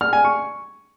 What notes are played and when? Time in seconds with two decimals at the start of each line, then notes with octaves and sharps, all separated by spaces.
0.01 F6
0.13 G#5
0.25 C#6